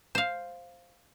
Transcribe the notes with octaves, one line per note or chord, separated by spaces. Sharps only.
C5 F5